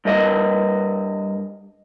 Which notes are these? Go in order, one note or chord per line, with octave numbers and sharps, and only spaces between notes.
G2 A#4 D#5